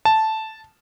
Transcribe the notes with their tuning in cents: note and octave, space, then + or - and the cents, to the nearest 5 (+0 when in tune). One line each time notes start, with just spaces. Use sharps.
A5 -5